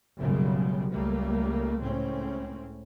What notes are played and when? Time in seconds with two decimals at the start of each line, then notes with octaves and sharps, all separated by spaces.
0.17 F#1 B1 F#2 C#3 G3 G#3
0.89 C#2 G3 A3 A#3
1.79 C#2 A2 C4 C#4